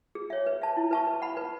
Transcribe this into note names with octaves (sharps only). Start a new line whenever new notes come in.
G#4
C#5 E5
B4
E5 A5
E4
B4 E5 A5 C#6
B4
F#5 B5
B4